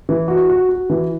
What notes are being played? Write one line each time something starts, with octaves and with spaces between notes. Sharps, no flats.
E3
F#4
F#4
F#4
E3